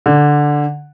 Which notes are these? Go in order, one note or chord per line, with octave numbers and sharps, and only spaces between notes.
D3